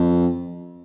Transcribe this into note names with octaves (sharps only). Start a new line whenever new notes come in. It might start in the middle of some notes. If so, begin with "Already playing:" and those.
Already playing: F2